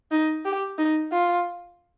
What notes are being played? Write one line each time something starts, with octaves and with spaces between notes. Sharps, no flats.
D#4
G4
D#4
F4